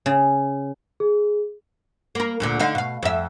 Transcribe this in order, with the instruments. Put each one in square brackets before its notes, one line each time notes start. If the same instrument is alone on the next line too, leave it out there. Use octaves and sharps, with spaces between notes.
[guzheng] C#3
[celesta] G#4
[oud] A#3 A#4
D2 A#2 D3
D3 D#4 F5
B2 F5
F2 E5